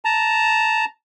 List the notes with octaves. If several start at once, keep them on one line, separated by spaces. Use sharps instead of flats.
A5 A#5